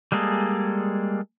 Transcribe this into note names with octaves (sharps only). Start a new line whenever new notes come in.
G3 G#3 A#3 G#4 A4